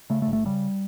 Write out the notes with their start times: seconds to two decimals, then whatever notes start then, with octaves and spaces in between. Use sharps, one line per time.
0.10 C#3 A3
0.22 A3
0.27 G1
0.33 A3
0.45 C#3 G3